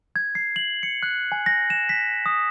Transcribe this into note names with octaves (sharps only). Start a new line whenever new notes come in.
G#6
C7
F#7
C#7
F#6
G#5
A#6
E7
B6
D#6